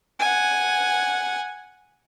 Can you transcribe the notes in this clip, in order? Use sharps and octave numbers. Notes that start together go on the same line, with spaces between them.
F#5 G#5